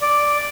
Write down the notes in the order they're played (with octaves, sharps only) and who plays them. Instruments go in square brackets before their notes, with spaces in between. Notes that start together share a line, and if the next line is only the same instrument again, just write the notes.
[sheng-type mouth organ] D5